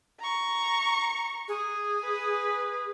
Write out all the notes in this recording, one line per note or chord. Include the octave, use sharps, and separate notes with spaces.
A#5 C#6
G#4
B4